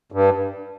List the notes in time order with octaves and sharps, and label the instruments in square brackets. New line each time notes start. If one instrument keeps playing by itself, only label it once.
[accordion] G2